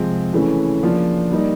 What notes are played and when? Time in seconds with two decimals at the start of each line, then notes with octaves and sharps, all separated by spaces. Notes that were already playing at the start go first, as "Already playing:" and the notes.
Already playing: C3 F3 G#3 C4
0.33 C#3 E3 A3 C#4
0.82 C#3 F3 A#3 D4 F4
1.32 G3 A#3 D#4